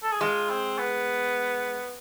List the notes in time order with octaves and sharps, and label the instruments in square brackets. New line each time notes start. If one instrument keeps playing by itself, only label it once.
[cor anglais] A4
G#4
[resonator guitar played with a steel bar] G#3 [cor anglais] F4
[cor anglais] C4
B3